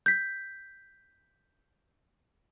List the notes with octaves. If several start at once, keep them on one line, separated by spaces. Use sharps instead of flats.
G6 B6